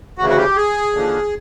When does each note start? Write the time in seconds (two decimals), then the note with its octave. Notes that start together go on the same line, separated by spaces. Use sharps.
0.18 D2 C#3 E3 F#4
0.30 F#4
0.38 G4
0.56 G#4
0.93 D#2 D3 F3